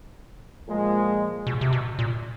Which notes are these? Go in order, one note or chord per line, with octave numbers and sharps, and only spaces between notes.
A#2 F3 G#3
B2
C3
B2
A#2